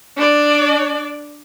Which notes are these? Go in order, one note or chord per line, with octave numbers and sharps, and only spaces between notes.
D4 D5